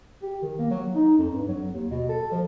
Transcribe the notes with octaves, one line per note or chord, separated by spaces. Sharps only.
G4
D#3
A#3
F#3
D#4
F2
G2
F#3
D#2
B2
A4
F3